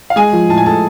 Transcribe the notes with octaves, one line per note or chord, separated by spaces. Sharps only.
F5
G#3 G#4 G#5
F3
A2 A5
G#5
A2 A4 A5